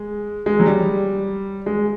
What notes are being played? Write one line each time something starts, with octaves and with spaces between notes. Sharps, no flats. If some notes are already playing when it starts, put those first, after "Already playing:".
Already playing: G#3
G#3
F#3
G3
G#3